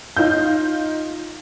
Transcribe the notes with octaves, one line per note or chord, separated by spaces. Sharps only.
D#4 F4 G6